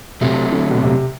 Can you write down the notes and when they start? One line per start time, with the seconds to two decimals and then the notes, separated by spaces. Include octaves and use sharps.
0.21 C3 F#3 A3 C4
0.52 D3
0.70 B2
0.82 C3